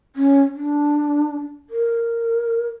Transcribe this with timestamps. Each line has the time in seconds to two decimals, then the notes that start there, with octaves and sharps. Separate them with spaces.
0.16 C#4
0.55 D4
1.70 A#4